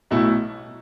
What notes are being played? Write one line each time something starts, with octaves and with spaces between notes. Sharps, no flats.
B1 B2 A3 E4